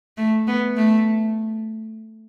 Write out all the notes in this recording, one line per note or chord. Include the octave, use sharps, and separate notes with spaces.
A3
B3
A3